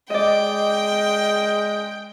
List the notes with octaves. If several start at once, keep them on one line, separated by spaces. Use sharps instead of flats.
G#3 D5 D#5 G5